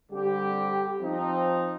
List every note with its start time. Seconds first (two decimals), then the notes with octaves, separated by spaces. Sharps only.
0.11 D3 G3 C4 G4
1.01 F3 C4 D#4